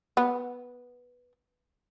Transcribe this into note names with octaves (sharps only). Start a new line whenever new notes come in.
B3